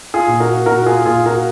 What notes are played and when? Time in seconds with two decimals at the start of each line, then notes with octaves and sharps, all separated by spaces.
0.14 F4 G#4
0.28 A#2
0.40 F#4 A#4
0.66 A#2 F#4 A#4
0.86 F4 G#4
1.06 A#2 F4 G#4
1.26 F#4 A#4